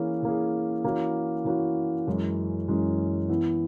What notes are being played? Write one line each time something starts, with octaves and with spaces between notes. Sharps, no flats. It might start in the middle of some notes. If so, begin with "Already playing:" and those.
Already playing: E3 A#3 C#4 G#4
E3 A#3 C#4 G#4
E3 A#3 C#4 F#4
E3 A#3 C#4 F#4
F#2 E3 G#3 C#4
F#2 E3 G#3 C#4
E3 B3 E4